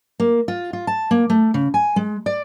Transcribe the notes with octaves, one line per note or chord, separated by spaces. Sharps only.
A#3
F4
F4
A5
A#3
A3
C#3
G#5
G#3
D5